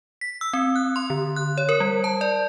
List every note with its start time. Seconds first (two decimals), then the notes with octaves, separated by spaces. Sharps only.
0.21 B6
0.41 E6
0.53 C4
0.76 F#6
0.96 C6
1.10 D3
1.36 F#6
1.58 C#5
1.69 A#4
1.80 G3
2.04 A5
2.21 D5